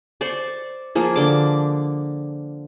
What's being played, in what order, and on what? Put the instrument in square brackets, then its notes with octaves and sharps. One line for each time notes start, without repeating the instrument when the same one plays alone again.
[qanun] C5 D5 C#6 D6
F3 A#3 G#4
D3 D6